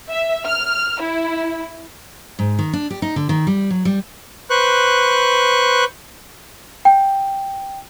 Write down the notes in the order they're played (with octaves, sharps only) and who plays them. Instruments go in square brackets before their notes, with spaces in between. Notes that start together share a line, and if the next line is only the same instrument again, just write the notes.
[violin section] E5
F6
E4
[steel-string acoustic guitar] G#2
D#3
D4
G4
D#4
D3
D#3
G3
F#3
G3
[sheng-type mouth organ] B4 C5 C#6 F#6
[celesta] G5